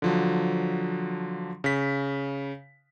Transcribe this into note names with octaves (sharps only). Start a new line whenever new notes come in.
D3 F3 F#3
C#3 B6